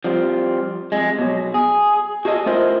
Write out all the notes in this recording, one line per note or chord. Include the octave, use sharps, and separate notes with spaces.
F3 G3 C4
F2 G#3
B2 F#3
G#4
F#4 G#4 A4 D#5
A3 E4 F4 A#4 C5 D#5